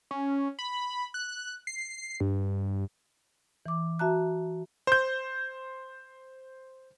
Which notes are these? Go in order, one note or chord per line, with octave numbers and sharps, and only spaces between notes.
C#4
B5
F#6
C7
G2
E3 D6
F#4 E5 A5 A#5 F#6
C5 G6